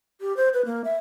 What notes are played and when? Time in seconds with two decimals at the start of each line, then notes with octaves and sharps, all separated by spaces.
0.21 G4
0.37 C5
0.54 B4
0.65 A#3
0.84 E5